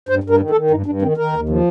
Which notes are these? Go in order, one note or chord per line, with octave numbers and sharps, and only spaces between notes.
G2 C5
G2
A#4
D#3
A4
D#3
G2 D#4
G2 D4
D#3 C4
D#3 A#4
D#2
F3